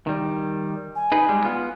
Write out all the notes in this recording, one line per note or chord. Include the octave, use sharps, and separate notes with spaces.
D#3 G3
G#5
D#4 G#4 B4
G3 G#3
B3 F4